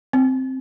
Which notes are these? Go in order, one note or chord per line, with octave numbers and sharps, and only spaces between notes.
C4